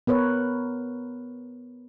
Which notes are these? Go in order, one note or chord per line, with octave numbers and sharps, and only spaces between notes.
B3 A#4 B4 C#5